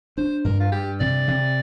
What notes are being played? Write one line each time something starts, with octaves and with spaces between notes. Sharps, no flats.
D4 C5
G2 A#4
F4
G2 G4
C3 D5
C3